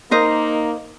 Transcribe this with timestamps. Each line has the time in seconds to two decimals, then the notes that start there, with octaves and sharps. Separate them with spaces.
0.11 A#3 D#4 A#4 C5 D#5